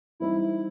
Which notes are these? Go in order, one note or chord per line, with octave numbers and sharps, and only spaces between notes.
E3 G3 C4 D#4 E4
E4